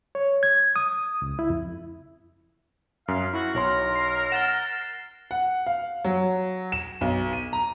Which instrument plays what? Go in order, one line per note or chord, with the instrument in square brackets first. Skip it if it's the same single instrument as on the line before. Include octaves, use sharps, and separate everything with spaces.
[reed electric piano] C#5
G#6
D#6
C#2
E4
F2
[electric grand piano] F#2 [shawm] F5
[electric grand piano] E4 [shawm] F#4
[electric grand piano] B1 C#5 C6 [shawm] A#4
[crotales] C7
[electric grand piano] F#5 [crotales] F6 A6 E7
[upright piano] F#5
F5
F#3
E7
B1
D#7
A#5